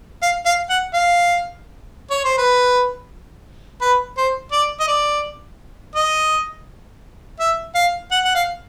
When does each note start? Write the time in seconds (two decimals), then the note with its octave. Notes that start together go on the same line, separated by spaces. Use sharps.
0.22 F5
0.46 F5
0.70 F#5
0.93 F5
2.10 C#5
2.24 C5
2.38 B4
3.81 B4
4.17 C5
4.52 D5
4.80 D#5
4.88 D5
5.95 D#5
7.40 E5
7.75 F5
8.11 F#5
8.25 F#5
8.35 F5